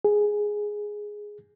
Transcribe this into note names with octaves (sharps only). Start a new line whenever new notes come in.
G#4